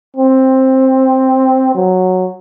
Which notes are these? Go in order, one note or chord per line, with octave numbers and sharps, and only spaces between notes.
C4
F#3